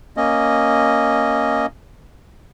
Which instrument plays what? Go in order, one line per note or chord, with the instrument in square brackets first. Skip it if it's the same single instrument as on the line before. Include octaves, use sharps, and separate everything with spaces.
[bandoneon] A#3 C#4 D#5